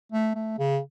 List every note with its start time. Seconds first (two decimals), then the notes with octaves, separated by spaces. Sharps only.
0.12 A3
0.35 A3
0.59 C#3